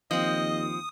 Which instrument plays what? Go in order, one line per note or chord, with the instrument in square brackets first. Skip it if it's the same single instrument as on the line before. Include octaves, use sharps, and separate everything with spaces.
[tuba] D#2 [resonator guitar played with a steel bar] F3 C4 [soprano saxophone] D#5 [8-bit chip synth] D#6